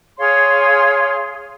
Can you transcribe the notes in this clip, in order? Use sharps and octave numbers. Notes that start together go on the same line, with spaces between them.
G#4 C#5 F5 C6